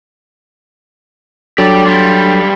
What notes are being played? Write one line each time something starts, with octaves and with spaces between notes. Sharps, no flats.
F#3 D4 G4 A4 D5
G3 F4